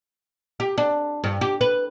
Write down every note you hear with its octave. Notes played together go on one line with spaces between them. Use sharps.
G4
D4
G2
G4
B4